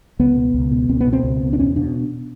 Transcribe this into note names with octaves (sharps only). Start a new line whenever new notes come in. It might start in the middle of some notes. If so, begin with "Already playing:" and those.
C#2 B3
B2
C#2
B2
C#2 C4
B3
B2
C4
C#2
B2
D4
E2 C#4
B2 D4